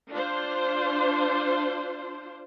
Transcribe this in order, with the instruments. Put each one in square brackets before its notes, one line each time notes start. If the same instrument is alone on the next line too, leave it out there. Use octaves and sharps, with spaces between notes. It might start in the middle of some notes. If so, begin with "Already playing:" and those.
[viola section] D4 F4 C5